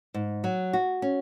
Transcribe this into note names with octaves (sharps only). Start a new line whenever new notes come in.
G#2
F#3
F#4
C#4